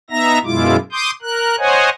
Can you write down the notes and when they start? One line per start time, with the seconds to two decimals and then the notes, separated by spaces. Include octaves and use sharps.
0.10 B3 D#4 E5 A#5 A#6
0.44 F#2 B2 G#3 E4 F4 D6
0.92 C6 D6 D#6 G6
1.22 A#4 F#6
1.58 C5 C#5 D#5 F#5 G#5